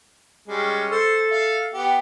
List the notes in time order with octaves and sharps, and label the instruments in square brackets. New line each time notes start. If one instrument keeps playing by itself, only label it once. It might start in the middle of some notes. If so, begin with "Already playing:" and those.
[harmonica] G3 G#3 C#4
[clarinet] A4 [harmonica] C5
[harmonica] E5 F5
B3 G4